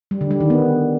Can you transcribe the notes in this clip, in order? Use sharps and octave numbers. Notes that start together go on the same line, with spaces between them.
G3
D3
G3
D#3
B3